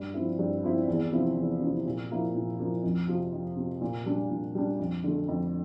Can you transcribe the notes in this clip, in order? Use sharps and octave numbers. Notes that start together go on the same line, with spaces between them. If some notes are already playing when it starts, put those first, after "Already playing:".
Already playing: G2
F3 C4 E4
G2
F3 C4 E4
E2
C3 F3 C4 E4
E2
C3 F3 C4 E4
A#2
F3 A#3 E4
A#2
F3 A#3 E4
F2
C3 F3
F2
C3 F3
A#2
G3 D4
A#2
G3 D4
F2
D3 A3
F2